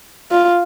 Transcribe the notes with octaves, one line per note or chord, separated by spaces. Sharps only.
F4